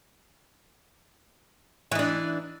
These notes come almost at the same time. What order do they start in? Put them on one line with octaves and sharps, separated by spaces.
E3 D#4 D4